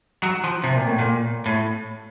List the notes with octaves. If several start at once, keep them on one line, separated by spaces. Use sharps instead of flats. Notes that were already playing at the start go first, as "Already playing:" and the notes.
F#3
F3
C3
A#2
A2
A#2
A2